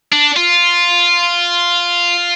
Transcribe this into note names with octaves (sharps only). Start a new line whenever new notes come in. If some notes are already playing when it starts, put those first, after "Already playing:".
D4
F4